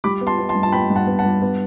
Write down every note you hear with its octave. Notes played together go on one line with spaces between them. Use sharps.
G3 B5 D6
B3
A5 C6
B3
A5 C6
G2
A5
B3 G5 B5
G2
F#5 A5
B3
F#5 A5
G2
B3